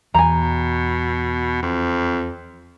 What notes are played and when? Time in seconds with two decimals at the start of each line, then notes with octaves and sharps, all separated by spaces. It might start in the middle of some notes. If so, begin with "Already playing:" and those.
0.14 E2 B2 G#5 A#5
1.63 F2